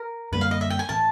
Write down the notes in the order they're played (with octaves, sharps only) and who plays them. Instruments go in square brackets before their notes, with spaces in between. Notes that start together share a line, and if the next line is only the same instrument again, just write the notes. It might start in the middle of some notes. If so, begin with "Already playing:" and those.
Already playing: [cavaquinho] A#4
[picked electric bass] F#2 D3 G3 A#3 [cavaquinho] B4
[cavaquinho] F5
D#5
E5
G5
G#5
[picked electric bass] A2 E3 [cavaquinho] A5